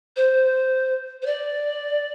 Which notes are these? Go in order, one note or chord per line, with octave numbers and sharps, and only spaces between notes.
C5
C5
D5